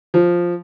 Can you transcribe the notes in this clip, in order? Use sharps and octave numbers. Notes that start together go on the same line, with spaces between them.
F3